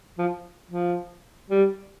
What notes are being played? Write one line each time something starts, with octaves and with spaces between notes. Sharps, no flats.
F3
F3
G3